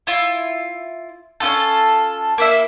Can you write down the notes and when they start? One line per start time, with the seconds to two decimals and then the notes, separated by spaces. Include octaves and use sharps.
0.07 E4 F4
1.40 C#4 D#4 F4 A4
2.38 A#3 E4 E5